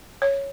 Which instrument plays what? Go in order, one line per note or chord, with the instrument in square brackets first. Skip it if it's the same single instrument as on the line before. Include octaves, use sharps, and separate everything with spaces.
[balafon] C#5